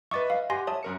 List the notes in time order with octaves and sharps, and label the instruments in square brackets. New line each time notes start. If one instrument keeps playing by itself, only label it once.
[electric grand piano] B4 D#5 E5 [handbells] C#6 D6 A6
[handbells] F5
[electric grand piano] G4 F#5 [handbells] G#5 C6 A#6
[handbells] C#5 E5 A5 [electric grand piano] D#6
[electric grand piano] F#2 A#4 C#7